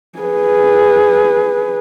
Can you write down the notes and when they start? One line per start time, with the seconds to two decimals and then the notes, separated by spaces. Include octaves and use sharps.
0.19 G#4 B4